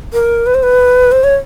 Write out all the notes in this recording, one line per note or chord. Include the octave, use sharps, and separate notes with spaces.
A#4
B4
C5
B4
C5
C#5